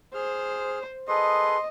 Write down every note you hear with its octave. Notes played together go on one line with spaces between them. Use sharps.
G#4 C5 F6
G#4 A4 B4 D#5 C6